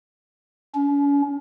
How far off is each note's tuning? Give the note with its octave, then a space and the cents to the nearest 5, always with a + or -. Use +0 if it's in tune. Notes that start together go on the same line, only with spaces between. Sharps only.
C#4 +40